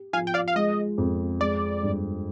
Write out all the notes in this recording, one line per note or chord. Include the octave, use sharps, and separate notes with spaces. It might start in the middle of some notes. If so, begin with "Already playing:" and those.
Already playing: G4
F3 F5 G#5
G5
D5 F5
F5
G#3 D#5
F2
G#3 D5
G2